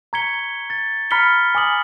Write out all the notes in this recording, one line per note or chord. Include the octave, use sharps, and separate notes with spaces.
A#5 C#6 G#6 B6 C#7 G7
A6
A#5 B5 F6 B6 C#7 G7
G#5 D6 D#6 F#7